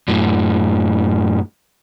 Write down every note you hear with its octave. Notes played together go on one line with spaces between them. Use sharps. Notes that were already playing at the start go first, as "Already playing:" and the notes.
F#2 A2